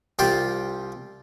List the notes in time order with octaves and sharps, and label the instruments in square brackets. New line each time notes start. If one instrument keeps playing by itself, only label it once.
[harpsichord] C2 F4 G4 G5 C6